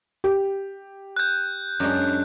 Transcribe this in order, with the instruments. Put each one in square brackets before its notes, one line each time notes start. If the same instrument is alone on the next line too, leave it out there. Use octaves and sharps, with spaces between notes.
[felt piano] G4
[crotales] F#6 G6
[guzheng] F#2 G#3 D4